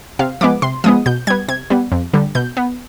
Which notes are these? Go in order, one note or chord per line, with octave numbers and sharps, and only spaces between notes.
C3 F5
F3 G#3 B3 D6
C3 C6
F3 G#3 B3 D#6
B2 G6
G3 B3 G#6
C3 G#6
G3 B3
F2
D3 G3
B2 G6
B3